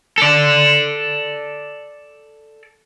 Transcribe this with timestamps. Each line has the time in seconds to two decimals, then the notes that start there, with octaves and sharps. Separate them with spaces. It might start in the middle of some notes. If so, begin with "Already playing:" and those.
0.18 A4 D5